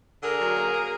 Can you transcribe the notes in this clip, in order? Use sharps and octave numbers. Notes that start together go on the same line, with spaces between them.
D3 G#4 A#4
F#3
A#3
A#3